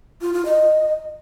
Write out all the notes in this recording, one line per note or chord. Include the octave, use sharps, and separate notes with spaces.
F4
F4
D#5